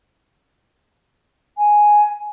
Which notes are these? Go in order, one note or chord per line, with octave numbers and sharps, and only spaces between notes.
G#5